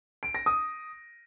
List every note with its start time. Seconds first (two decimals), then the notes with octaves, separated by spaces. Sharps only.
0.23 D7
0.34 A#6
0.46 D#6